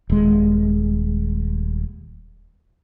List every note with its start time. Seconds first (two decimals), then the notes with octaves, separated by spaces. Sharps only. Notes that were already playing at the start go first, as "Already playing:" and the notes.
0.10 D#1 G#3